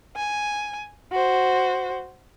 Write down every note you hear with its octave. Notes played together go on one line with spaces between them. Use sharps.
G#5
F#4 C5